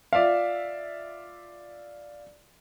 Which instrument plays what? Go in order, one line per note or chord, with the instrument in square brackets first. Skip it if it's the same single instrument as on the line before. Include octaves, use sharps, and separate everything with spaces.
[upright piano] F4 D5 E5 F5